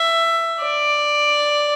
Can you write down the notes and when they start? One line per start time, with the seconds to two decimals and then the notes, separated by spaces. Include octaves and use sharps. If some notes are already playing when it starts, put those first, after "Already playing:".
Already playing: E5
0.61 D5